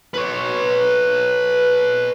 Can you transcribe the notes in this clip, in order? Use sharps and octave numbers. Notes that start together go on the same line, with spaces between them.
B4 C#5